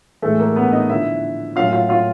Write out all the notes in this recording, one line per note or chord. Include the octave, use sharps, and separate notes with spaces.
A2 E3 G#3 A3 A4
A#3 A#4
B3 B4
D#4 D#5
D3 F3 A#3 E4 E5
A2 F#3 A#3 C#4 F4 F5
F4 F5
F4 F5